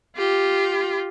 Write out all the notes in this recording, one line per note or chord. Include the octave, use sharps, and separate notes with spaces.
F4 G4